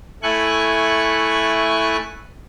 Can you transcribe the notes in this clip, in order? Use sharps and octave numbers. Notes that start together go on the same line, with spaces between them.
A3 E4 G#5 C#6 F#6